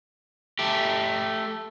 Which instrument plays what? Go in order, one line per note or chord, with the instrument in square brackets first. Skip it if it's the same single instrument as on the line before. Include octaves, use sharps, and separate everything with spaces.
[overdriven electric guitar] A3 G4